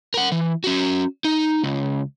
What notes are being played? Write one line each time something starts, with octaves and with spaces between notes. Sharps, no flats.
A#4 F#5
E3
C#4 F#4
D#4
C#2